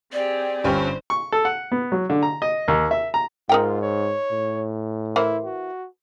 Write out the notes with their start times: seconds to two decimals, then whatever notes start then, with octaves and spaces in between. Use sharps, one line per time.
0.13 C4 G4 G#4 D5
0.64 G1 G2 C#4 G4 C5
1.10 C#6
1.32 A4
1.45 F#5
1.72 B3
1.92 F#3
2.10 D3
2.23 A#5
2.42 D#5
2.68 D#2
2.91 E5
3.14 A#5
3.49 G#2 D#4 F4 A#4 G5
3.82 C#5
4.32 A2
5.16 E3 E4 A#4 C5
5.45 F#4